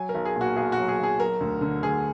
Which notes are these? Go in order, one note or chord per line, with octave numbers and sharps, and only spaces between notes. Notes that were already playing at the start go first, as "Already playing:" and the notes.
Already playing: F#3 G#5
A#4
B1
G#4
A#2
F#4
B1 G#4
F#4
F#3
G#4
B1 G#4
F#3 A#4
D2
D3
D2 G#4